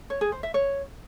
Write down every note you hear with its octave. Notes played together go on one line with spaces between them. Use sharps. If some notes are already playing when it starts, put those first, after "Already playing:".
C#5
G#4
C5
E5
C#5